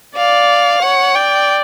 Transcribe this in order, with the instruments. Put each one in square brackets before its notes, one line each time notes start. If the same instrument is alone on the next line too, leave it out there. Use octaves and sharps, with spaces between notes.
[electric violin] D5 [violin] F5
[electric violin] C#5 [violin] F#5
[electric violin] D5 [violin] G5